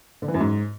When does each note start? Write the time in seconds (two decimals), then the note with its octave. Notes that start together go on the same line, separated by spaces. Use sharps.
0.22 D3
0.28 E3
0.34 F#2
0.40 G#2